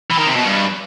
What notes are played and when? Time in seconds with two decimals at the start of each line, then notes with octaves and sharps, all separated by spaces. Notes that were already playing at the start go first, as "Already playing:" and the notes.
0.11 E3
0.18 D#3
0.27 C3
0.36 B2
0.44 G2